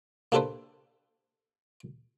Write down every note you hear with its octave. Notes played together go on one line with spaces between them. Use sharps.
A#3 D4 G4 A4 B4 C5